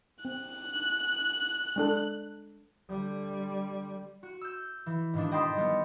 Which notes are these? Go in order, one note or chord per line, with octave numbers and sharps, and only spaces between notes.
C4 F#6
G#3 D4 A4
D3 G3
F#4
E6 G6
E3
G#2 B2 D#3 A#3 D4
D#5 G5 A5 B5 C6 D#6
G3 B3